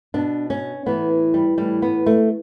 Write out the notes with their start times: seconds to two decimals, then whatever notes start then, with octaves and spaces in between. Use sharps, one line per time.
0.14 B2 D4
0.50 C#4
0.86 A2 E3 B3
1.34 G3
1.58 A2 E3 G3
1.82 B3
2.06 A3